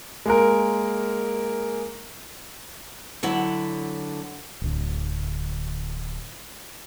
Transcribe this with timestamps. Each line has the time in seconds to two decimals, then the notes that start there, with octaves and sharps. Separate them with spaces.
0.26 G#3 A#3 A#4
3.23 D3 F#3 E4
4.62 D1 D2